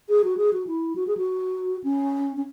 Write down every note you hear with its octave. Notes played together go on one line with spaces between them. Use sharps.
G#4
F#4
G#4
F#4
E4
F#4
G#4
F#4
C#4
C#4